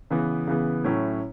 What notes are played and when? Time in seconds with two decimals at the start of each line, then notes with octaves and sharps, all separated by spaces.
0.11 C#3 E3 B3
0.47 C#3 E3 B3
0.84 A2 F#3 C#4 E4